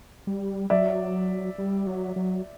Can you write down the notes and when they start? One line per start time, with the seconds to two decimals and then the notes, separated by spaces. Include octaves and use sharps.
0.27 G3
0.70 F#3 D5 E5
1.58 G3
1.87 F#3
2.16 F#3